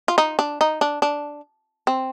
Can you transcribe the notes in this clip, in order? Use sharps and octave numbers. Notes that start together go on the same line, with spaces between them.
F4
D#4
D4
D#4
D4
D4
C4